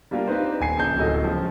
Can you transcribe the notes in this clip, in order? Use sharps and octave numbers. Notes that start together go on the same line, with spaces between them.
G3 A#3 D4 F4 G4 A#4
C4 D4 D#4 B4 C5
D#1 G#5 C7
A#1 C#3 A5 G6
D1 C3 F#3 A4 D#5
C#3 F3 G#3